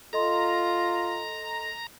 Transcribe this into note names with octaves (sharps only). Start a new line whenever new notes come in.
F4 A4 D#5 A#5 C6